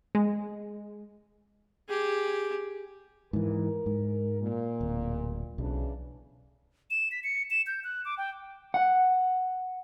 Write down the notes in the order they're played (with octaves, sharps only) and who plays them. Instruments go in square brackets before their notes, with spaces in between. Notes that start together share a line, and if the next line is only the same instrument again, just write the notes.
[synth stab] G#3
[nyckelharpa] G4 G#4
[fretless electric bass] G#2 E3 [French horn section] A#4
[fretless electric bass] G#2
[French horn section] A#2
[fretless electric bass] D1
[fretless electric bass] B1 [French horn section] C#3 E3 D4
[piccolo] E7
B6
C#7
E7
G6
F#6
D6
G5
[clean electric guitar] F#5